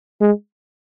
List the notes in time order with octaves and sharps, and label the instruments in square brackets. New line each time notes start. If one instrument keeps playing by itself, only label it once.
[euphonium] G#3